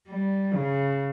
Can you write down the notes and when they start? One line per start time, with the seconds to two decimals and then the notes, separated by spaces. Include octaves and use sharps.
0.08 G3
0.53 C#3